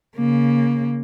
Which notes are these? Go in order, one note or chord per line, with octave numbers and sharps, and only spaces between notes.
C#3 A#3